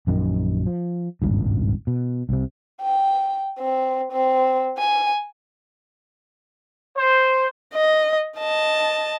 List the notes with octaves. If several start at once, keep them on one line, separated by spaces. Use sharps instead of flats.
A#1 F#2 D#3
F3
D#1 G#1 C#2 G2
B2
C2 C3
G5
C4
C4
G#5
C5
D#5
D#5 A5